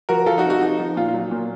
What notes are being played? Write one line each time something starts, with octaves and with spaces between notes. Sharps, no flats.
F3 F#4 A#4
F3 F4 A4
D#4 F#4
C3
D#4 F#4
F3 D#4
F3
A#2 F4
F4
F#3
A#2